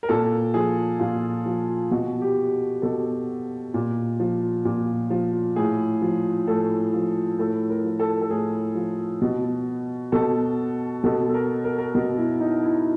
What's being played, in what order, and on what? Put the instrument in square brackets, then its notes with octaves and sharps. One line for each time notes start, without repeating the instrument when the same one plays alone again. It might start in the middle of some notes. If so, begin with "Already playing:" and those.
[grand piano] A#4
A#2 A4
F3 G#4
A#2 F4
F3
B2 F#4
G4
B2 A4
A#2
F3
A#2
F3
A2 G#4
F3
A2 A4
F3
A2 A4
A#4
F3
A4
A4
A2 G#4
F3
B2
B2 A4
B2 A4
A4
A#4
A#4
A#4
B2 A#4
E4
D#4
E4